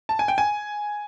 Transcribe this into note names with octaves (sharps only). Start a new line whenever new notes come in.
A5
G#5
G5
G#5